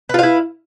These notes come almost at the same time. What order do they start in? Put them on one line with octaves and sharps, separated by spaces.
B4 F4 F5 E4